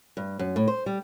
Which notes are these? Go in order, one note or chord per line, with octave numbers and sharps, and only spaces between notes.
G2
F#2
A2
C5
G3